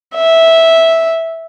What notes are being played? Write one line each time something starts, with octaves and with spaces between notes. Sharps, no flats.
E5